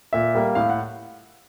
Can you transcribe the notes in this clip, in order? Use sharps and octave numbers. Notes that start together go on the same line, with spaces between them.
A#2 E5
G3 A#3
A2 F5
F#5